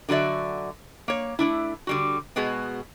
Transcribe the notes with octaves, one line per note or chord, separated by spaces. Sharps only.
D3 F#3 F#4 D5 E5
A#3 C#5
A3 D4 E4
D3 G3 F#4
B2 G#3 B3 F#4 G#4